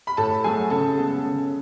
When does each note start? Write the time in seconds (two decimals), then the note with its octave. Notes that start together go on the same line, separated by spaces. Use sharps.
0.07 B5
0.17 A2 A4 A5
0.44 F#3 A3 G#4 G#5
0.70 C#3 A4 A5
0.97 G#3 B3
1.24 C#3